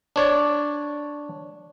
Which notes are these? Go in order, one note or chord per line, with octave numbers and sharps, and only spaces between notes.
D4 C#5 D5